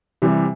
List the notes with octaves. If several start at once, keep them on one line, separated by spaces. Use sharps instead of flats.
C3 E3 G3